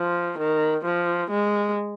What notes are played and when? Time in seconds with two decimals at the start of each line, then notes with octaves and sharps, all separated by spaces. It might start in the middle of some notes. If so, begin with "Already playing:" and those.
Already playing: F3
0.38 D#3
0.85 F3
1.30 G#3